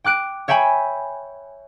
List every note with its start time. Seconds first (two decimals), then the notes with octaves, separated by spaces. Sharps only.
0.04 G5 D6 F#6 D7
0.48 C#5 E5 G5 G#5 B5